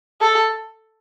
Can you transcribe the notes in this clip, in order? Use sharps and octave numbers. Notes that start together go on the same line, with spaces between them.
A4